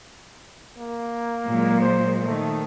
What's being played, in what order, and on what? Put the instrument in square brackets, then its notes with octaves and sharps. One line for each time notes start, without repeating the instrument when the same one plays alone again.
[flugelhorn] A#3
[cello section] A#2 F#3 G#3
[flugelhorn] C5
[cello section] D#3 [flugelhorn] A3